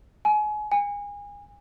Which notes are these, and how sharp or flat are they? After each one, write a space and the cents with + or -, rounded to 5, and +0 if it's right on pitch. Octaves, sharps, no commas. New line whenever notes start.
G#5 +30
G#5 -30